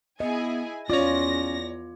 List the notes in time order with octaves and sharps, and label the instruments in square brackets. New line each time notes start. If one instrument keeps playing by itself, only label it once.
[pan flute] B3 [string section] E4 G#4 G#5 [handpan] D#5
[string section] E2 A#6 [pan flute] C#4 [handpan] F4 [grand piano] C#5 D5